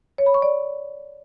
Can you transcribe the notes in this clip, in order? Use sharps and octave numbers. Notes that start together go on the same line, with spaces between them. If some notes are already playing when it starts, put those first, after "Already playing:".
C#5
B5
C#6
D5